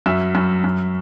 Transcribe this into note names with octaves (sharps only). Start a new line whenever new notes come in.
F#2 E5
F#2
F#2